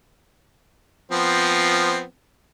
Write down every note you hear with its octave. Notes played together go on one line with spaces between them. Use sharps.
F3 B3 C4